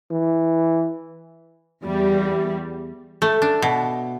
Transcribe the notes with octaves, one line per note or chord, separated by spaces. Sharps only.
E3
E2 G3
A3
D4
B2